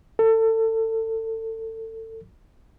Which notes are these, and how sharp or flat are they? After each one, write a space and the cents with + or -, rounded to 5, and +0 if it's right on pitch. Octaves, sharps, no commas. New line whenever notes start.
A4 +30